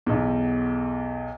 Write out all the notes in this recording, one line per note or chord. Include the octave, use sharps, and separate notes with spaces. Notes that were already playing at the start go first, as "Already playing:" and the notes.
B1 E2